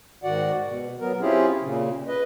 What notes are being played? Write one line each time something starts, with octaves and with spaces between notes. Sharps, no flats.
G#2 D#3 F#4 D5 F#5
B2
F#3 B3 A#4
C4 C#4 E4 F4 G4 G#4
A#2 C#3
B4 D#5